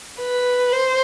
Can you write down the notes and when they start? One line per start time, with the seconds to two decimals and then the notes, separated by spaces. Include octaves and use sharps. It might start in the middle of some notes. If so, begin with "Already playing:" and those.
0.20 B4
0.72 C5